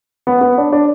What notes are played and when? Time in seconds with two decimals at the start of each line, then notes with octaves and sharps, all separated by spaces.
0.27 B3
0.41 B3
0.58 D4
0.73 D4